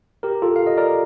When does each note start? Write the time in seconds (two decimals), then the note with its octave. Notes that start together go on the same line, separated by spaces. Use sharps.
0.23 G4 A#4
0.42 F4 A4
0.56 F5
0.67 D#5
0.77 A#4 D5